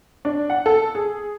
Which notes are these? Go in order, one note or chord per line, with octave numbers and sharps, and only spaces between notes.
D4
F#5
A4
G#4